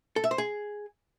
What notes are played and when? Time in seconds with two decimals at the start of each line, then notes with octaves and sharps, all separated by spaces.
0.16 A4
0.24 E5
0.31 C5
0.38 G#4